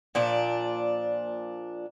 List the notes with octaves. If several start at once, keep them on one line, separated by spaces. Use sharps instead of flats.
A#2 F3 D4